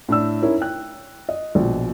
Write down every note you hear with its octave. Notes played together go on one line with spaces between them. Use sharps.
A2 D4 E6
C#4 D#4 E4 A#4 C#5
G5 F#6
D#5
A#1 B2